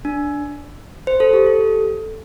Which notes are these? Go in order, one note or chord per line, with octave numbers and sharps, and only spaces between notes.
D4
C5
A4
G4
A4